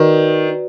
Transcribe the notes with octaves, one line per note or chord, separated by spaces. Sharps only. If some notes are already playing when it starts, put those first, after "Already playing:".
Already playing: D#3 F#4 B4 D5